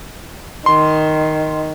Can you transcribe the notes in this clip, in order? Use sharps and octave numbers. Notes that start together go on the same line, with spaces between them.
D#3 C6